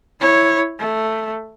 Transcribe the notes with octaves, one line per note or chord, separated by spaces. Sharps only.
E4 C#5
A3